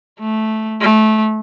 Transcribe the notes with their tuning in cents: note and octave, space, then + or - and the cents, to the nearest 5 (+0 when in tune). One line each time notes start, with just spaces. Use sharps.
A3 -10
A3 -20